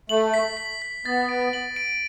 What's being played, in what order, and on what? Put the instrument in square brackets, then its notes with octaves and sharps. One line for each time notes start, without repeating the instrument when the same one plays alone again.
[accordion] A3 [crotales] F#7
[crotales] B6
B6
B6
[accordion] B3 [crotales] A6
[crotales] D7
F#7
D7